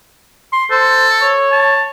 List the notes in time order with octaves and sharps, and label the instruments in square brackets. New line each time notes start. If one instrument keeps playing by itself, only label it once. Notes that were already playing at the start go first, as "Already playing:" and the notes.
[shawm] C6
[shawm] A4 [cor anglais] C5
[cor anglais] C#5
[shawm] A5